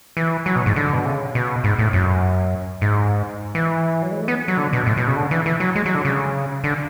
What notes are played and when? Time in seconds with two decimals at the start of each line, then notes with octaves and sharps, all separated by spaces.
0.17 E3
0.46 F#3
0.56 B2
0.66 G#2
0.76 D3
0.93 B2
1.05 C#3
1.35 B2
1.64 G#2
1.79 A2
1.93 F#2
2.81 G#2
3.55 E3
4.02 F#3
4.12 G#3
4.20 A3
4.28 B3
4.48 F#3
4.57 D3
4.73 B2
4.87 A2
4.97 B2
5.07 C#3
5.16 D3
5.31 E3
5.46 E3
5.60 F#3
5.75 G#3
5.86 F#3
5.95 D3
6.05 C#3
6.64 D3